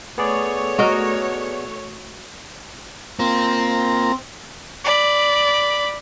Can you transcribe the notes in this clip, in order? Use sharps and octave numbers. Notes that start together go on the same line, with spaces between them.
A3 B3 G#4 C#5 D5
F#4 A#4 D#5
A#3 C4 F4 A#5
D5 B5